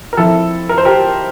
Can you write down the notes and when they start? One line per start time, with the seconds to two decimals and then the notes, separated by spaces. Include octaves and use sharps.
0.13 A#4
0.17 F3 C4 E4 A4
0.69 A#4
0.78 C5
0.85 G4 A#4